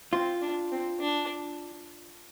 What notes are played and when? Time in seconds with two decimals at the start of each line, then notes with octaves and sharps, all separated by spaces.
0.13 C4 F4
0.42 D4
0.72 C4
1.00 D4